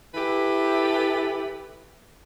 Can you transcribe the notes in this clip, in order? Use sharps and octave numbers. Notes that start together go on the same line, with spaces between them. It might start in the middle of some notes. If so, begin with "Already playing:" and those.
E3 E4 G4 A4 B4